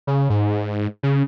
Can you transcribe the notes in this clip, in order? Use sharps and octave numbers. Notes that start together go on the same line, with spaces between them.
C#3
G#2
C#3